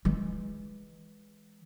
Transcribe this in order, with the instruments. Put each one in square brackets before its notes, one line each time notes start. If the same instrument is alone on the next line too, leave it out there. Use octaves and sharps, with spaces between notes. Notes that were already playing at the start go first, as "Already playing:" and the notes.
[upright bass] E3 G#3